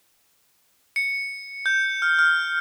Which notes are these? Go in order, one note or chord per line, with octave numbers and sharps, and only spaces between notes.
C#7
G6
F6
F6